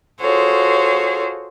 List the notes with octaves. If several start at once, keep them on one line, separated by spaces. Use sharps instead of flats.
F4 F#4 G#4 A4 C5 C#5